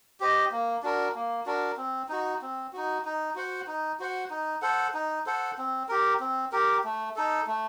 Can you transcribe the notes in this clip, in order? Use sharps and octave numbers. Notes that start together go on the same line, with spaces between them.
G4 C5 D#5
A#3
D4 F#4 A#4
A#3
D4 F#4 A#4
C4
D#4 F#4
C4
D#4 F#4
D#4
F#4 C5 F#5
D#4
F#4 C5 F#5
D#4
A4 C5 F#5
D#4
A4 C5 F#5
C4
G4 A#4
C4
G4 A#4
A3
D#4 A4
A3